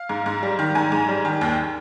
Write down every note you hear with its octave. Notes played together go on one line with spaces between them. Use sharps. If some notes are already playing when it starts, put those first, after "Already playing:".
Already playing: F5
G#2
G#2
G3
D#3
G#2 G#5
G#2
G3
D#3
D#2